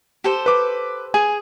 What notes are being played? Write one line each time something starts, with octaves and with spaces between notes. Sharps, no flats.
G4 A4 C5
B4 D6
G#4 G#5